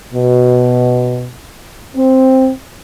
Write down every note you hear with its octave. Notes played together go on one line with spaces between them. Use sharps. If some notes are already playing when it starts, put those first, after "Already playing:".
B2
C4